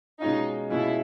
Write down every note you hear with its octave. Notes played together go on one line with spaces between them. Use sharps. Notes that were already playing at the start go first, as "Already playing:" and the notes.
B2 G#3 C#4 D#4 F4
B2 G#3 C#4 E4 F4